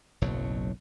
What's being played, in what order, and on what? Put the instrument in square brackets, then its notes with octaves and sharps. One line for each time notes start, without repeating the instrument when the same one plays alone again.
[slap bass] F#1 B1 A2 F#3